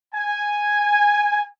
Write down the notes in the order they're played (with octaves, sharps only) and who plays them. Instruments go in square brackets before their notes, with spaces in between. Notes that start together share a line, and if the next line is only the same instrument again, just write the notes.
[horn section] G#5